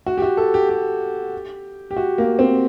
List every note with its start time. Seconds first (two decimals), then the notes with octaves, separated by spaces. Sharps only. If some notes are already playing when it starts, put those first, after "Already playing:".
0.06 F#4
0.18 G4
0.22 F#4
0.37 A4
0.54 G4
0.69 G4
1.91 G4
1.97 F#4
2.18 A#3
2.39 C4